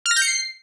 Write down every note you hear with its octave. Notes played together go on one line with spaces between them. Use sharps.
F6
A#6
G6
C#7
C7